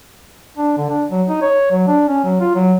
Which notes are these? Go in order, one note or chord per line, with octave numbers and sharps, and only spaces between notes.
D4
D3
D4
F#3
D#4
C#5
F#3
D4
C#4
F#3
F4
F#3